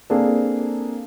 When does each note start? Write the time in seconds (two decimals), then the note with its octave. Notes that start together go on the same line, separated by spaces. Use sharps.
0.10 A#3 C4 D4 G#4 A4